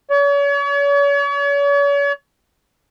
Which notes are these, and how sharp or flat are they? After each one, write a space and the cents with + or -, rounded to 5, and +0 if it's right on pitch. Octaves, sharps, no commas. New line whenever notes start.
C#5 +40